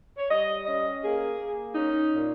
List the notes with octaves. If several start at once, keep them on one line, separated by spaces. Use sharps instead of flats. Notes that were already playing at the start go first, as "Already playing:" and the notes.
C#5
G3 D#5
C#4 D#5
A#3 G#4
A#3
C#4 D#4
A#2